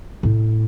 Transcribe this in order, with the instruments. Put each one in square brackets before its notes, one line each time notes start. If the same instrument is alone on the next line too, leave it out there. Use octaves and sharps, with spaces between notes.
[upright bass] A2